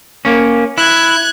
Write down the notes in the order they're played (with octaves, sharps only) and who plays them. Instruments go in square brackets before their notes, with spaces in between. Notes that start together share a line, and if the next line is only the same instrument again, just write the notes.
[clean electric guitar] A#3 C#4
[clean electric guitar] E4 [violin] F#6 G#6